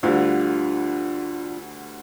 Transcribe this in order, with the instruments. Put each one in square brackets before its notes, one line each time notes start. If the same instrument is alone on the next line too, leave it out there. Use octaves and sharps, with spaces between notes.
[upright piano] D2 D3 G3 [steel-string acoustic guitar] D4 F4